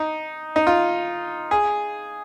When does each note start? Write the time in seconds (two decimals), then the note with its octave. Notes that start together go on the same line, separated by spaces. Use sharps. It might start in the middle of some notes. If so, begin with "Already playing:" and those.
Already playing: D#4
0.56 D#4
0.67 F4
1.51 G#4